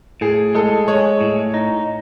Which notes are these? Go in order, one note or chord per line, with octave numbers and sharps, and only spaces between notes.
A2 G#4
G#3 A4
G#3 C#5
A2
D#4